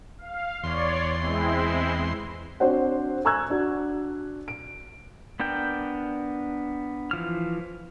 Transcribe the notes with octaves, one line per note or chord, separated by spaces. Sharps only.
F5
E2 C#5 D5 C6
G#3 C4 E4
C4 D4 F#4 C5 C#5 F#5
G#5 A#5 C#6 E6 F#6 G#6
D4 F#4
D7
B3 D4 A#4 G5
E3 F3 F6